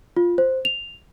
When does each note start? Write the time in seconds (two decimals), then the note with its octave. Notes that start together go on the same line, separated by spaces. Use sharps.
0.17 F4
0.38 C5
0.65 F7